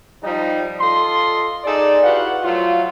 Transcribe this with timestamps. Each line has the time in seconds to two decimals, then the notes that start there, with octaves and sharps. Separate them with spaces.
0.23 F3 G3 D#4
0.80 F4 A4 D#5 C6
1.64 D#4 G#4 A4 D5
2.03 E4 F#4 G4 B4 F5 F#5
2.43 F3 F#3 A3 F4